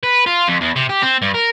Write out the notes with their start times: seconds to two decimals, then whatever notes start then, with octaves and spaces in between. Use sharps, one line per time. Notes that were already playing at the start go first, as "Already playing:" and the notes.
0.03 B4
0.26 F4
0.48 F2
0.61 E2
0.76 C3
0.89 G4
1.02 C4
1.22 G2
1.34 A#4